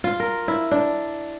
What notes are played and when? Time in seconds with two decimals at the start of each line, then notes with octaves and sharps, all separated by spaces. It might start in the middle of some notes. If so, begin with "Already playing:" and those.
0.04 F4
0.20 A#4
0.48 E4
0.71 D4